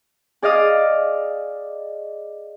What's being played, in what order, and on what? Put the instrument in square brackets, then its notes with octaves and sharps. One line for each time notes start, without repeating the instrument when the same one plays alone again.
[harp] G#4 D5 D#5 F5 D#6 F6